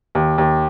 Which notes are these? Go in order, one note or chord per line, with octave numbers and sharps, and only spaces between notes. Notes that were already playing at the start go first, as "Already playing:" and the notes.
D#2
D#2